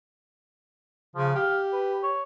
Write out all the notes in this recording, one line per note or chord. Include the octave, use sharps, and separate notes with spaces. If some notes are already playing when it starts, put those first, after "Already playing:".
C#3 F3
G4 F5
B4
C#5